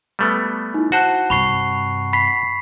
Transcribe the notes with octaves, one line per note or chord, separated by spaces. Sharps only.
G3 A3 B3
D#4 E4
F#4 C5 F#5 A5 F#6
G2 C3 B5 C#6 C7
B5 B6 C7